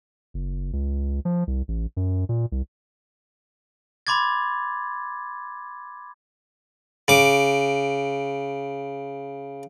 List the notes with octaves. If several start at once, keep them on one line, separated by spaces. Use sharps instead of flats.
F#1
C#2
F3
C2
A1
F#2
A#2
C2
B5 C6 D6 G#6 A6
C#3 D6